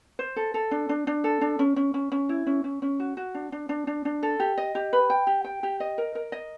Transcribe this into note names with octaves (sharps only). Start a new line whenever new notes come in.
C5
A4
A4
D4
D4
D4
A4
D4
C#4
C#4
C#4
C#4
E4
C#4
C#4
C#4
F#4
F#4
D4
D4
D4
D4
D4
A4
G4
D#5
G4
B4
G5
G4
G5
G4
D#5
A#4
A#4
D#5